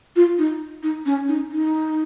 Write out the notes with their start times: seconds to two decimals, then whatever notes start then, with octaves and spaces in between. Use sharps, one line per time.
0.16 F4
0.38 D#4
0.83 D#4
1.06 C#4
1.28 D#4
1.50 D#4